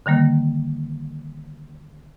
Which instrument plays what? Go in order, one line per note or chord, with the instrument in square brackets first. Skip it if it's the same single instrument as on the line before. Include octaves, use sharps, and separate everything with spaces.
[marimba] D3 D#3 G3 A#3